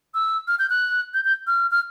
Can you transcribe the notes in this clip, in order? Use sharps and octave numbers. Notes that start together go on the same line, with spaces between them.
E6
F6
G6
F#6
G6
G6
F6
F6